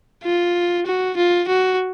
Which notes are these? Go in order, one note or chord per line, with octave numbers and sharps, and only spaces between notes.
F4
F#4
F4
F#4